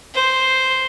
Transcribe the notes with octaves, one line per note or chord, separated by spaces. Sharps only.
C5